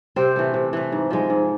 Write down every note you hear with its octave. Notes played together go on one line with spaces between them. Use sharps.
C3 C4 C5
E3 A3
C3
E3 A3
G#2
F3 G#3
G#2